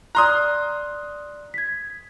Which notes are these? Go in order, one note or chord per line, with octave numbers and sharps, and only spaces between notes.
D5 A#5 C6 D#6 F6 F#6
G#6 B6